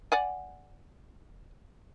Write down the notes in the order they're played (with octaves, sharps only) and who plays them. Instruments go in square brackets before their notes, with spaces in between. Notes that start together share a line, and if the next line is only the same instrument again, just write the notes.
[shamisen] D5 F#5 G#5